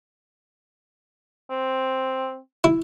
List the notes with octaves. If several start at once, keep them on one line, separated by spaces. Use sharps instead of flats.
C4
E4